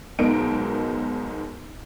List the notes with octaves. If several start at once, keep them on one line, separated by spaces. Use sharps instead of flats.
B1 G#2 B2 D#4 A#4 D7